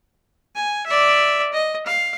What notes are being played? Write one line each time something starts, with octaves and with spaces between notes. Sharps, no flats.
G#5
D5 E5
D#5
F5